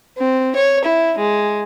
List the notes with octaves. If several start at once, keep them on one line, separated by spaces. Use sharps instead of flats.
C4
C#5
E4
G#3